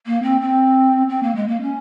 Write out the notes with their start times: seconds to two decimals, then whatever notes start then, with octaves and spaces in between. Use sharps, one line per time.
0.06 A#3
0.22 C4
0.40 C4
1.08 C4
1.23 A#3
1.35 G#3
1.48 A#3
1.61 C#4